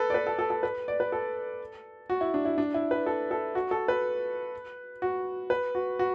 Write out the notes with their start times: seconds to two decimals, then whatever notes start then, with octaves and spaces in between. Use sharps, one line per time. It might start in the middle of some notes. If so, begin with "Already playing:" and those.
Already playing: A4 B4
0.10 D5
0.14 B4
0.27 A4
0.39 A4
0.50 A4
0.63 B4
0.88 D5
1.00 B4
1.12 A4
2.10 F#4
2.21 E4
2.34 D4
2.45 E4
2.58 D4
2.74 E4
2.91 B4
3.06 A4
3.31 A4
3.55 F#4
3.71 A4
3.88 B4
5.02 F#4
5.50 B4
5.75 F#4
5.99 F#4